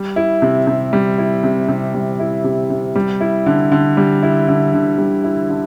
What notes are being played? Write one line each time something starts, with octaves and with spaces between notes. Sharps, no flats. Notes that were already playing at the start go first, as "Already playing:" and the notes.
Already playing: G3
E4
C3
C3
G3
E4
C3
C3
G3
E4
C3
C3
G3
E4
D3
D3
G3
E4
D3
D3
G3
E4
D3